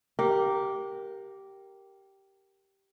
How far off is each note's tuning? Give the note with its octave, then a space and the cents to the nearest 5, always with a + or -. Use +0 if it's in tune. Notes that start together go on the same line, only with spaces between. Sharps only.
G4 -10 A#4 -5 F5 +45